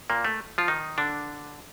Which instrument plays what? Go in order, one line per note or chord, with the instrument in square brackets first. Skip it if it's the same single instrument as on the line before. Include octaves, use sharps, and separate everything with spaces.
[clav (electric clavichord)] A#2 A#3
A3
F3 F4
D#3 D#4
D3 D4